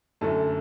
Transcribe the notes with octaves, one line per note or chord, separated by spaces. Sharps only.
F#2 D3 A3 A5